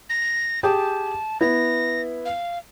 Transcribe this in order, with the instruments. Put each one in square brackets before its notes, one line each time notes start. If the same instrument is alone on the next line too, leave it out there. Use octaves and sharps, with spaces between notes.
[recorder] A#6
[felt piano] G4 G#4 G5 [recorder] A5
[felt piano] B3 E4 [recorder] A#6
[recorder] F5